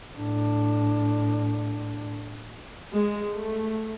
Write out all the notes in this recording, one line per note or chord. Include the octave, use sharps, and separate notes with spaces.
A2 D4
G#3
A3